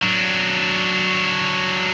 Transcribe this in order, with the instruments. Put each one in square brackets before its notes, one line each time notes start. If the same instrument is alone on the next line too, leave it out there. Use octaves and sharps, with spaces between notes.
[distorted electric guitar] F#3 D4